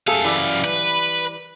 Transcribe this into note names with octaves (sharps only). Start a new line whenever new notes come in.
F#2 A3 G#4 A4 F5
E3 G3
B4